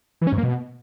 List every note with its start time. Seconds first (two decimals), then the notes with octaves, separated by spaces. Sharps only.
0.21 E3
0.27 C#4
0.32 G#2
0.38 A#3
0.43 B2